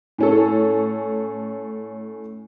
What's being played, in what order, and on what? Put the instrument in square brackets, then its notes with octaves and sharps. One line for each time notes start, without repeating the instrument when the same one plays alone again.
[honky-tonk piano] A2 C#4 A4